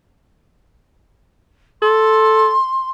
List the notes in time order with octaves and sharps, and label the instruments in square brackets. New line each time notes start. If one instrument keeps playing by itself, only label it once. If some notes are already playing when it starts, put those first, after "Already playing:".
[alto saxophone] A4 [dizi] C6